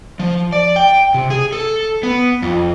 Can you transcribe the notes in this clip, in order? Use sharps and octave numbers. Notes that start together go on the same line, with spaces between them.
F3
D5
G5
C3
G#4
A4
B3
F2